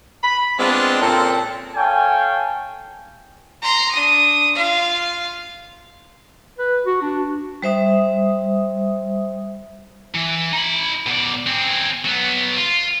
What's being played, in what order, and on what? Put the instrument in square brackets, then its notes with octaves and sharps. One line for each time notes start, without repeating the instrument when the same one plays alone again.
[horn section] B5
[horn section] G#3 C4 [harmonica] B3 D4 F4
[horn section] A#2 C#3 C4 [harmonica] A4 A#4
[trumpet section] A4 C#5 F5 G5 G#5
[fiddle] A#5 C6
D4 D#6
F4 F5
[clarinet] B4
F#4
D4
[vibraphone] G3 C5 E5 D#6
[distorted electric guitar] E3
D#4 B5
B2 D5
C4 G#4
F#3 B3
F4